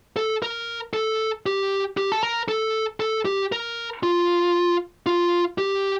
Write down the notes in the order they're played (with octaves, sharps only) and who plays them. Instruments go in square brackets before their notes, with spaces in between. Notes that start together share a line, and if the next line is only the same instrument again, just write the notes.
[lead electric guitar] A4
A#4
A4
G4
G4
A4
A#4
A4
A4
G4
A#4
F4
F4
G4